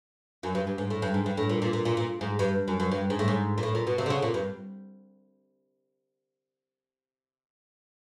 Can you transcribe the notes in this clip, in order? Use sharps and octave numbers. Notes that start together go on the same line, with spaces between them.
F#2
G2
G2
G#2
A2
G2
G#2
G2
A2
A#2
A#2
A#2
A#2
A#2
G#2
G2
F#2
F#2
G2
G#2
A2
G#2
A#2
A2
A#2
B2
C3
D3
C#3
A#2
G2